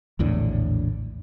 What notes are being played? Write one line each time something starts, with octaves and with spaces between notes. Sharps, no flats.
A#1 E2 A2 D3